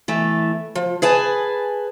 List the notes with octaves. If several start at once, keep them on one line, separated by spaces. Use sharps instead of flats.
E3 A3
F3
G#4 B4 G#5 A5